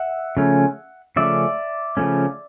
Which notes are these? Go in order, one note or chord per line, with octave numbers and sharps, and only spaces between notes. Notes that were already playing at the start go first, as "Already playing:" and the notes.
Already playing: E5 F#5
C#3 F3 A3 C#4
C#3 F3 A3 C#4 D5 E5
C#3 F3 A3 C#4